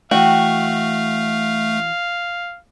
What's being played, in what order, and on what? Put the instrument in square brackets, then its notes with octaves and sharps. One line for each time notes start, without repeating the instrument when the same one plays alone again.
[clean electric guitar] E3 F#4 [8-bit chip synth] A3 [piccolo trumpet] F5 [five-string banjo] G5